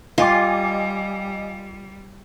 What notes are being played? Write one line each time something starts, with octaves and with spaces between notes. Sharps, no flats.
G3 F4 D#5 F5 G5 G#5 D6